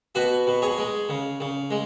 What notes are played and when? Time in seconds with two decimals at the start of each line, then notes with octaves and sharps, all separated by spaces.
0.15 B2 F#4 B4
0.47 B2
0.62 G#4 C#5
0.78 G#3
1.09 C#3
1.40 C#3
1.71 G#3